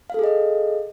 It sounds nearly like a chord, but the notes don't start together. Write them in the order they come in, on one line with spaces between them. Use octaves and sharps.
F5 A4 G#4 D#5